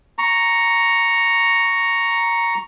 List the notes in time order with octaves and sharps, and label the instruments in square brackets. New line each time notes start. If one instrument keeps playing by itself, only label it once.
[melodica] A#5 C#6